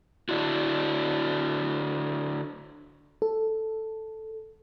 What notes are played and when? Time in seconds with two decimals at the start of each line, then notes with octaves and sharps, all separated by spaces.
0.29 D3 D4 E4 F#4
3.22 A4